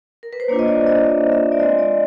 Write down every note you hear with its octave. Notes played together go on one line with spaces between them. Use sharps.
A#4
B4
C5
A#3 D4 F4 C#5
D#5
D5
D#5
E5
E5
D5
G#3 C4 F4 D#5
D5